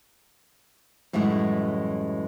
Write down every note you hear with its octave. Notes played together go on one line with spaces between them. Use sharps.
F#2 A2 E3 G3 G#3